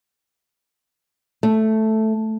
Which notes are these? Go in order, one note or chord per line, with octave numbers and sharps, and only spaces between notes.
A3